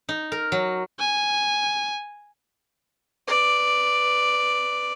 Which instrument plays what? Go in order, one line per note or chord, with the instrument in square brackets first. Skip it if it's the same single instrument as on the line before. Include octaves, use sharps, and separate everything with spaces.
[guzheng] D#4
A#4
F#3
[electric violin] G#5
[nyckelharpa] B4 D5